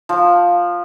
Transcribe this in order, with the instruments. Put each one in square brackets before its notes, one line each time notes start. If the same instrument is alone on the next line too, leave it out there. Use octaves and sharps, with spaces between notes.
[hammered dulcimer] F3